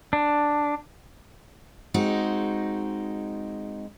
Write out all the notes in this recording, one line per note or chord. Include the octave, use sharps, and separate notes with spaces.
D4
G#3 C4 D#4 F#4